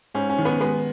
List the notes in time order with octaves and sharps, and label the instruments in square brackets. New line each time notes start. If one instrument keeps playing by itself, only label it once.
[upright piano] G#2 C#4
C#4
D#3
B3
G#3 B3